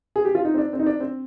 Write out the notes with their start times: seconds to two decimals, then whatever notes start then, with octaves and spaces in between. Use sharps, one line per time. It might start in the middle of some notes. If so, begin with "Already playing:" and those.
0.16 G#4
0.25 G4
0.35 F4
0.45 D#4
0.54 C4
0.58 D4
0.73 C4
0.79 D#4
0.86 D4
1.00 C4